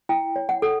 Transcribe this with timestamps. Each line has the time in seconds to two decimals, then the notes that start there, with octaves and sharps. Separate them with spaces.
0.09 E4 G5
0.36 C#5
0.49 F#5
0.62 A4